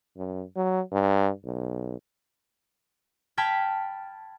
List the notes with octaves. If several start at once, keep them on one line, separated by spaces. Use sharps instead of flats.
F#2
F#3
G2
B1
G5 A5 B5 F6 G#6 B6